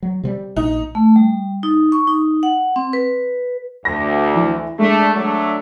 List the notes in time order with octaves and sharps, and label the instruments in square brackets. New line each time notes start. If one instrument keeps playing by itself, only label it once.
[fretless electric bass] F#3
C3 F3 G3
[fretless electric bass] A#1 [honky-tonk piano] D#4
[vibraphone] A3
G3
D#4
C#6
D#4
F#5
C4
B4
[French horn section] D2 [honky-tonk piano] A#6
[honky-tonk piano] E3
[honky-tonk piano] G#3 [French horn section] A3 D4
[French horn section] F#3 A3 D4